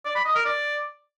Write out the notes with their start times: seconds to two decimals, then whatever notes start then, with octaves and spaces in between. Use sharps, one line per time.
0.05 D5
0.15 B5
0.25 D#5
0.35 A#4
0.45 D5